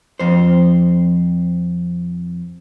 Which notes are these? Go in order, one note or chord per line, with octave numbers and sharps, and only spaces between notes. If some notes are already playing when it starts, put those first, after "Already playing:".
F2 C5